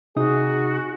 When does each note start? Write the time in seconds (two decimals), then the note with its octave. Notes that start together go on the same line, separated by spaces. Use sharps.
0.16 C3 D#4 F#4 G#4 D#6